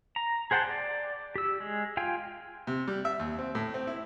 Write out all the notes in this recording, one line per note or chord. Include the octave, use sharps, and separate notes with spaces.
A#5
G#4 C5 F#5 G5 A5
D5
G4 E6
G#3
F4 F5 G5 G#5
C3
G3
E5
D#2
C4
A2
C4
E4